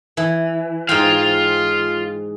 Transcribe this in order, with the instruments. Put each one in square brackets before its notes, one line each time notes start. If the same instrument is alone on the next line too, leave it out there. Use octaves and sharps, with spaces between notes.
[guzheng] E3
[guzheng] G#2 C5 G5 [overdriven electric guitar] F4 F5